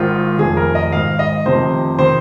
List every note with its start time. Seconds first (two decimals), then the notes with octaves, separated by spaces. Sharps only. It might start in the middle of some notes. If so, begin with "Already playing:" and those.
Already playing: G#1 G#2 D#3 F4
0.39 F1 F2 D#3 G#4
0.57 A#4
0.75 D#5
0.92 G#1 G#2 D#3 F5
1.19 D#5
1.46 F1 F2 C3 D#3 C5
1.99 D#3 C5